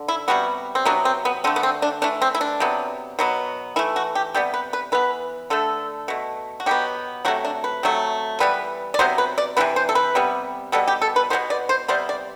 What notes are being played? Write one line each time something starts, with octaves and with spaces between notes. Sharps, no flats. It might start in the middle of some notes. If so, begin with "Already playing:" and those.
Already playing: D3
E4
C3 G3 B3 F#4
C4
C3 F#3 B3 D4
C4
B3
D3 A3 C4
B3
C4
D4
E3 A3 D4
C4
E4
D4
C3 F#3 B3
B2 F#3 B3
E3 A3 E4
F#4
G4
C3 G3 B3 G4
B4
B4
E3 B3 B4
D3 A3 A4
B2 A3
F#4
B2 F#3 B3 G4
C3 F#3 A3 F#4
D4
B4
C3 F#3 A3
E3 G3 B3 B4
D5
C3 F#3 B3 C5
B4
D5
C3 E3 B3 B4
C5
A4
B4
C3 G3 B3
B2 G3 B3 A4
G4
A4
B4
B2 G3 B3 C5
D5
C5
C3 G3 B3 C5
D5